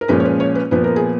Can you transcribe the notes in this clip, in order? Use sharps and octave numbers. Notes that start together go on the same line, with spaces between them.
A#4
A#2 F3 G#3 C#4 B4
C#5
B4
C#5
B4
A#2 F3 B3 B4
A#4
G#4